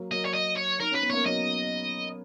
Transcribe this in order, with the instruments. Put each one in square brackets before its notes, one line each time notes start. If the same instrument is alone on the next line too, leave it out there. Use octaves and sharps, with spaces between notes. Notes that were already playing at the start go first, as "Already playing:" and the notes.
Already playing: [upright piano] F#3 A#3
[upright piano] F#3 A#3 [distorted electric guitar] D#5
[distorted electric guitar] C#5
D#5
C#5
[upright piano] D#4 [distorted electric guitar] A#4
[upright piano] C#4 [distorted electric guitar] B4
[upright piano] B3
[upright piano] A#3 C#4 [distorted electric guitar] C#5
[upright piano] F#3 A#3 [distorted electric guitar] D#5